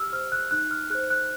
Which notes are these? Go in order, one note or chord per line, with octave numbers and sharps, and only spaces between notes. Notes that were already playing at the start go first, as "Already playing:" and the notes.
Already playing: G4 E6 F6
C5 F6
F#6
D#4 F#6
F6
G#4 C5 F#6
F#6